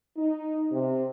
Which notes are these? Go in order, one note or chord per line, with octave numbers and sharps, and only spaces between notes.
D#4
C3